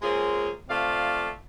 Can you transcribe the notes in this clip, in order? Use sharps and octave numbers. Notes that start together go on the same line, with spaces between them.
G#3 A#3 C4 C#4 F4 G#4
C3 A3 F4 D5 F5